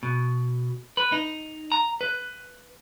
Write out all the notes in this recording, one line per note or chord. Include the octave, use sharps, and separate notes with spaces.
B2
B4
D#4
A#5
B4